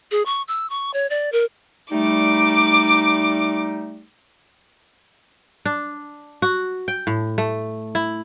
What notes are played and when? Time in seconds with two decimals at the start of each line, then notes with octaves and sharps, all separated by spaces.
0.11 G#4
0.26 C#6
0.48 E6
0.70 C#6
0.94 C#5
1.10 D5
1.32 A#4
1.92 G3 A3 D#4 D6
5.66 D4
6.42 F#4
6.88 G5
7.07 A2
7.38 A3
7.95 E4